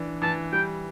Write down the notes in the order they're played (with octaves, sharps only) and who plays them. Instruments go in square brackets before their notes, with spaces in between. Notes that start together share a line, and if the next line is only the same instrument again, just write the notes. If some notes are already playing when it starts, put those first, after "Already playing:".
Already playing: [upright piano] E3 D4
[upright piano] E3 [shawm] A5
[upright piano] G3 [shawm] G5